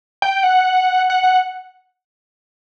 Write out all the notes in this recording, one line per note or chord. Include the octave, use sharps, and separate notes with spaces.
G5
F#5
F#5
F#5